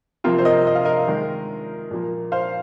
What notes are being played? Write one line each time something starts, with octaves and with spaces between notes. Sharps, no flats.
C3 F3 A#3 C4 F4
C5
A#4 D#5
D#5
F5
A#4 D#5
D#3 G#3
A#2 F3 A#3
C5 F5